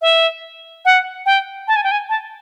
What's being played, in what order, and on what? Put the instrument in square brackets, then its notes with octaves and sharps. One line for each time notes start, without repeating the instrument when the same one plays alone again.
[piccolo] E5
F#5
G5
A5
G#5
G5
G#5
A5